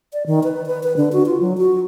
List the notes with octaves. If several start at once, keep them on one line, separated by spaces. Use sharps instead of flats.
D5
D#3
B4
B4
B4
D3
F#4
F4
F#3
F#4